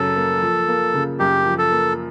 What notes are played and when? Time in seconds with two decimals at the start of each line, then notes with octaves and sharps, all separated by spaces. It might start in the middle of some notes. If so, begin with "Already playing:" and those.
Already playing: F#2 C#3 F#3 A4
0.16 A#3
0.42 F3
0.68 A#3
0.94 C#3
1.19 F#2 G4
1.45 F3
1.58 A4
1.71 A#3